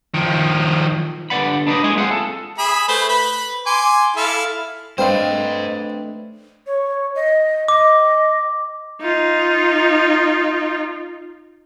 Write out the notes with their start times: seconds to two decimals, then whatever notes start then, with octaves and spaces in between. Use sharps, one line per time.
0.14 D#3 F3
1.30 G2 D3 B4 D5 F#5 B5
1.66 D4 D#4 B4 C5 D5 D#5
1.84 G#3 E4 D#5 G#5
1.97 C4 F4 G#4 F#5
2.11 A4
2.58 G#4 E5 B5
2.88 A3 B4 C5
3.09 B4 B5
3.66 G#5 C6 D6
4.16 E4 A4 F5
4.98 A3 C4 D4 B4 C5 D#5 F5
6.67 C#5
7.15 D#5
7.68 D#5 D6
9.01 D#4 F4